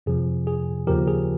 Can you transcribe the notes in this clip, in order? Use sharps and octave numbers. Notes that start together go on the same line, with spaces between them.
F2 C3 F3 G#4
G#4
D#2 C#3 F3 G4 A#4
G#4